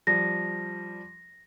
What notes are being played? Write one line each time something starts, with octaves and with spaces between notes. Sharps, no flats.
F3 G3 A#6